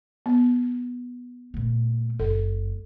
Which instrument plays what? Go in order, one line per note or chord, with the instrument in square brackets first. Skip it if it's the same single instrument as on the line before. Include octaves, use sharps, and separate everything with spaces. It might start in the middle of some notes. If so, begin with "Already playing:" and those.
[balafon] B3
[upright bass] A#2 A3
[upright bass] F#1 G2 [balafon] A4